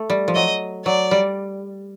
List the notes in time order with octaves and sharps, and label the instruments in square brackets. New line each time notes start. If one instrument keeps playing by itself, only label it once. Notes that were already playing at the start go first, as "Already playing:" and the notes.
Already playing: [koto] A3
G3
F3
[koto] F#3 [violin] D#5
[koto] F#3 [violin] D5
[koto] G3